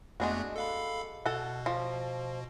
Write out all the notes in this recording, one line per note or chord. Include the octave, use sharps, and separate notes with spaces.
F2 G#3 A3 B3 D4 F#4
A4 F5 B5
B2 A4 F#5
F3